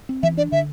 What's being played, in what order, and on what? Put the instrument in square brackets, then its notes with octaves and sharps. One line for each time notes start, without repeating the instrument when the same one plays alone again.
[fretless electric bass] C4
[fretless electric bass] E3 [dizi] E5
[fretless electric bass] D4 [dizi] D5
[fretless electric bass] D3 [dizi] E5